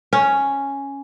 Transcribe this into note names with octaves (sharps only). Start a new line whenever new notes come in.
C#4